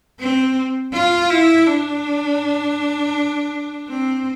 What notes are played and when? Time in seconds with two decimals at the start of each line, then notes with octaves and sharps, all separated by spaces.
0.20 C4
0.93 F4
1.30 E4
1.67 D4
3.89 C4